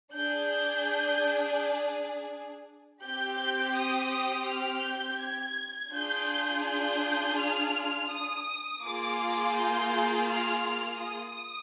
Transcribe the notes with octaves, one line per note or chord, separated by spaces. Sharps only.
D4 G#4 G6
C4 G4 G6
D#6
F6
G6
G#6
D4 F4 G#4 G6
G6
F6
D#6
A#3 F4 G#4 D6
G6
F6
D#6